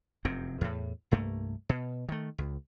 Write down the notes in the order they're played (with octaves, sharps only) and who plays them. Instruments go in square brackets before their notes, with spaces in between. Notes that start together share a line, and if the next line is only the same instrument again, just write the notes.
[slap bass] F1 F#2 C3 C4
E2 A2
C2 G2 A3 A#3
B2
D#3 A3
C#2